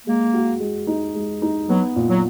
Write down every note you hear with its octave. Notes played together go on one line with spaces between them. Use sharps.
G#3 A#3
F#4
G#3
D#4
G#3
D#4
F#3 B3
A#2
F#3